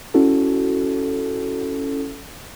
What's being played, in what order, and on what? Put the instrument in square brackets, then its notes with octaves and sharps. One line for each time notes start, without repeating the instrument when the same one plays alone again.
[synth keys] C#4 E4 F#4 A4